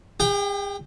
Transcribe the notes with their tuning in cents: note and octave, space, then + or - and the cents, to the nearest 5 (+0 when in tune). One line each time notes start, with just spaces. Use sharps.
G#4 -45 G5 +0